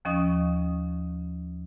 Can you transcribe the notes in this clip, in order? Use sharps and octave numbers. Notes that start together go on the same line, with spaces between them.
D#2 F3 C#4 D#5 C#6 D#6